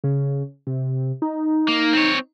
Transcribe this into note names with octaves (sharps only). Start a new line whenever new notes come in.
C#3
C3
D#4
A#3
C4 C#5